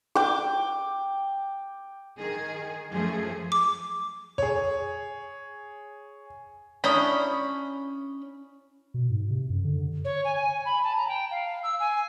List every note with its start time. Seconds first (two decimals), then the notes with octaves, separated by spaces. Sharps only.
0.15 G5 D6
2.18 D#3 G#4
2.90 F#2 F3 A3 G#4
3.52 D6
4.38 G#4 C#5
6.84 C#4 D4 E4 C#5 A#5 B5 D#6
8.94 B2
9.10 G#2
9.30 C3
9.50 F#2
9.64 D3
10.05 C#5
10.25 G#5
10.36 G#5
10.66 B5
10.83 A5
10.97 A#5
11.08 G5
11.31 F5
11.63 E6
11.80 G#5